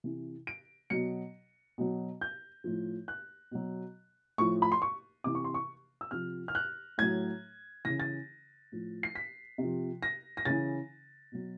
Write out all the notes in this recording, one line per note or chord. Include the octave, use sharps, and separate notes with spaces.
C3 E3
D7
B2 F#3 C#7
B2 F#3
G6
A2 F3
F#6
B2 F#3
A2 F3 C#6
B5
C6
C#6
C3 E3 D6
C#6
C6
C#6
E6
C3 F3 F6
F6
F#6
A2 F#3 G#6
C#3 E3 A#6
A6
A2 F3
C7
B6
C3 F3
A#6
A#6
C#3 E3 A6
B2 F#3